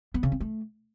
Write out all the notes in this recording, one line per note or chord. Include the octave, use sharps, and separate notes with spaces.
B3
C#3
C4
A3